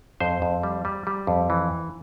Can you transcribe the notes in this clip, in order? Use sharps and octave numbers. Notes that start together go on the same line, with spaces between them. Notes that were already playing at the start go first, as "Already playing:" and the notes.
F2 C5
F2
G3
G3
G3
F2
E3